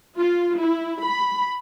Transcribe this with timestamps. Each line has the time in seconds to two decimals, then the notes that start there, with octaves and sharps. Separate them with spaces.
0.19 F4
0.60 E4
1.04 B5